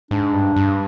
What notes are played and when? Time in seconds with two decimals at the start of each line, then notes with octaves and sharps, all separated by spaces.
0.11 G#2 D4
0.33 G2
0.56 G2